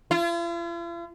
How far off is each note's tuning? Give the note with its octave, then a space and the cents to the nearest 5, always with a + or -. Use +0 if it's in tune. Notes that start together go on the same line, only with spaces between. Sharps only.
F4 -45